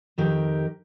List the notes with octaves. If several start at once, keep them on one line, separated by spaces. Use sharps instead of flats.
F2 D#3 G4 A#4